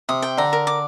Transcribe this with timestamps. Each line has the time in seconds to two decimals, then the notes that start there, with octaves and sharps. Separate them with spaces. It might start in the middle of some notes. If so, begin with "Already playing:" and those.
0.09 C3 D#6
0.22 G5
0.38 D3 A#5
0.53 A#4
0.67 D6